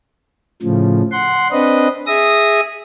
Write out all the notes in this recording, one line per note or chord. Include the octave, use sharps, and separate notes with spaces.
A2 C#3 F3
F#5 C6
C4 D4 B4 D#5
G#4 E5 D#6 A#6